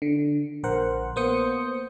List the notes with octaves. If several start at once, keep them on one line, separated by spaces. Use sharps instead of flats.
D3
A#1 A#4 C5 F#5
A#3 B3 C5 D#6 G6 C#7